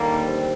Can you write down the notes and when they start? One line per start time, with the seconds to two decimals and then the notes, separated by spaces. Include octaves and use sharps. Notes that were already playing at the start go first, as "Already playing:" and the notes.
Already playing: D#2 D3 G3 A#3
0.23 C4